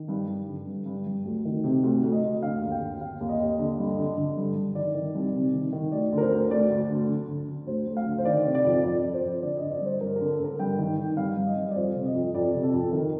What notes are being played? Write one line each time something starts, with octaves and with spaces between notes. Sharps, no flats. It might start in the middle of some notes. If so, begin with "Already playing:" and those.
Already playing: D#3
G2
G2
D3
G2
G2
G2
D2
D#3
C3
D2
D2
D#5
D2
D3 F5
D#2
G5
D#2
D#2 F5
D#2
D#5
D#2
D3
G2
D3
D3
G2
G2
D#3 D5
D#3
C2
C3
D#3
D#3
D2 D5
D3
A#4
C5
D2
D2 D5
D2
D3
D3
D3
D3
D2 C5
D2
F5
D3
C5
D#3 D5
C3
D5
F2
F2 D5
F2
C5
F2
D3 D5
D3 D#5
D5
G2 C5
G2 A#4
D3 A#4
A4
D3 A#4
G2 G5
D#3
D#3
G2 F5
G2
D#5
G2
D5
F2 C5
C3
D#5
F2
F2 D5
C3
A4
F2
D#3 A#4